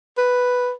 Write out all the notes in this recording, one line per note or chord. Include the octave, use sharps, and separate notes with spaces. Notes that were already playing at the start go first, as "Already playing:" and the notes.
B4